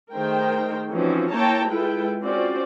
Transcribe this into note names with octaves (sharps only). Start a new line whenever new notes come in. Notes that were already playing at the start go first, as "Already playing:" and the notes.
D#3 A3 G#4 A#4 C5 G5
E3 F3 C4 C#4 D#4 F#4
A#3 E4 C#5 G5 A5 A#5
G#3 E4 F4 A4 B4 G5
C4 C#4 F4 F#4 C5 D5